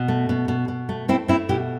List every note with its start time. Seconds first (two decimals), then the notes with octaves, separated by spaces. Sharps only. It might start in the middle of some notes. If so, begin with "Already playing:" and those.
Already playing: B2
0.08 A3
0.29 B2
0.48 B2
0.68 B2
0.89 A3
1.08 A3 C4 E4
1.28 A3 C4 E4
1.49 B2 E4 G4